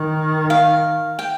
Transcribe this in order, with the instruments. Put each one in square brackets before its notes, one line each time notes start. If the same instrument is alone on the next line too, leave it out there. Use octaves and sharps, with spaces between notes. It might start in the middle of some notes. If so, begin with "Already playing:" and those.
Already playing: [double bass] D#3
[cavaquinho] F5
G5